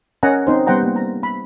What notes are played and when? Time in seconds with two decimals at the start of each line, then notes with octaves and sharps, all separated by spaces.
0.23 C#4 A#4 D#5 F#5 G#5 A#5
0.47 C4 D#4 C5
0.67 G3 B3 C5 F#5 G5 A#5
0.83 A#3
0.96 A#5
1.23 B5